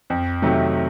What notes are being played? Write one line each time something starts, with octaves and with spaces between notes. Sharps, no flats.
F2
C3 D#3 F#3 A3